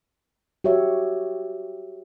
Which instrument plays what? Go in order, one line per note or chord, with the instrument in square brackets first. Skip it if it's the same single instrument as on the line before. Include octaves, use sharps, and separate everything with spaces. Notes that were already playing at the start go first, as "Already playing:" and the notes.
[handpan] F#4 G4 C#5 E5